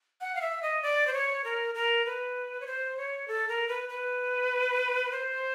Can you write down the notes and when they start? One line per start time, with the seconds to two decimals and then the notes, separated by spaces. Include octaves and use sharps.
0.21 F#5
0.35 F5
0.41 E5
0.63 D#5
0.83 D5
1.07 C5
1.13 C#5
1.44 A#4
1.75 A#4
2.05 B4
2.61 C#5
2.67 C5
2.97 C#5
3.28 A4
3.48 A#4
3.68 B4
3.89 B4
5.12 C5